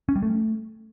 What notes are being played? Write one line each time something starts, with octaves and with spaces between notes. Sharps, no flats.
C#4
G3
A3